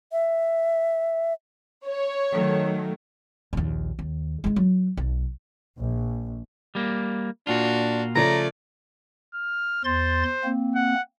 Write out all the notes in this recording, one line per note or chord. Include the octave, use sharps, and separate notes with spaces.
E5
C#5
D#3 F#3 A3
A#1 D#2
D#2
G#3 E4
F#3
B1
A#1
G3 A#3
A#2 D4 F4 F#4
C#3 F3 A3 D5 A#5
F6
E2 C5 C6 A6
A#3 C4
F#5